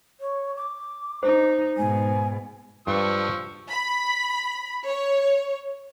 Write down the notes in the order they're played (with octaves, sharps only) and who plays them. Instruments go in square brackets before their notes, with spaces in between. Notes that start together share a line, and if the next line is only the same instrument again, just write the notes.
[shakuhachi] C#5
D6
[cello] D#4 [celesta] C5
[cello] G#2 B2 [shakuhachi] G#5
[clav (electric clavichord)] G2 D4 [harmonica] F3 C#6 E6
[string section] B5
C#5